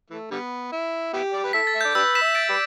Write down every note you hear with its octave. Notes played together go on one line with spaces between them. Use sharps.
E3 A3
D3 G3 B3
E4
B3 E4 G4
D5
B4
E4 A4 B6
A6
E5
D5 G6
D4 G4 B4 E6
B6 E7
E5
A6 D7
G4 B4 D5